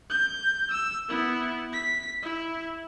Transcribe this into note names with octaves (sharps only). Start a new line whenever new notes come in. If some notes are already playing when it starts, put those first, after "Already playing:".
G6
E6
B3 E4
B6
E4